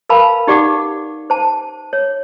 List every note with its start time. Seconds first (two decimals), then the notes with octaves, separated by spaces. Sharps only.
0.09 A#4 B4 F5 A5 B5
0.47 D#4 G4 D5 F#5 D6
1.30 C5 A5
1.93 C#5